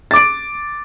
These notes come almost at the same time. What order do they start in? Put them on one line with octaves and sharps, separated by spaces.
A6 D6 D7